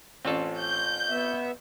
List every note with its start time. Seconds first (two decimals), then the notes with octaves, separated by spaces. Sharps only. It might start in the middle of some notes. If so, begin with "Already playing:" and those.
0.25 A1 C4 C#4 F4 A4
0.58 G6
1.09 B3 E5